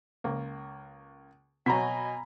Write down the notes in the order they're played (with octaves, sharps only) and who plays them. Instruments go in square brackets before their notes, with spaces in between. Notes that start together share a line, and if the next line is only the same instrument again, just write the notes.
[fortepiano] C#2 A#3
[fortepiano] B2 F#3 [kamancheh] D#5 G#5 [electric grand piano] A#5 B5 B6